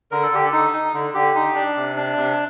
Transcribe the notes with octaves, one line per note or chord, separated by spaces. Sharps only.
D3 A#4
A4
D3 G4
A4
D#4
D#4
D3
D3 G4
D#4
D4
C3
D4
C3